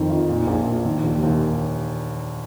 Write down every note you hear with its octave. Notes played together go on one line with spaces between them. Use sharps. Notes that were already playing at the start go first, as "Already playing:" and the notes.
Already playing: F2 D#3
F4
A#2
A#1
A#2
D#3
D#2
D#2